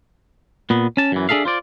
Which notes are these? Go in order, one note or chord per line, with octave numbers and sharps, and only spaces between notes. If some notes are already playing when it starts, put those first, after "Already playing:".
A#2 B3
C#4 A5
F#2 E3
D4 G#4 A4 E5 F5
F4 C5 D5